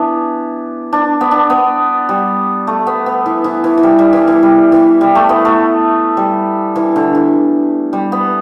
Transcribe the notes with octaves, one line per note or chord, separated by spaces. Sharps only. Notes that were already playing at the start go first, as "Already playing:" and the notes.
Already playing: E3 B3 D4
D4
B3
D4
B3
G3
A3
B3
B3
E3
E3
E3
E3
G3
G3
E3
E3
G3
E3
G3
A3
B3
A3
G3
E3
D3
E3
G3
B3